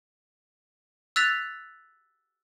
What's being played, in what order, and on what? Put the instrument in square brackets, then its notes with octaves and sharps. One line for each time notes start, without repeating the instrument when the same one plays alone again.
[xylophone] E6 F#6 A6 B6 F7